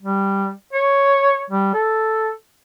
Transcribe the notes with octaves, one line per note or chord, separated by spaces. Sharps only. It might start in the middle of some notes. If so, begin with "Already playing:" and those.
G3
C#5
G3
A4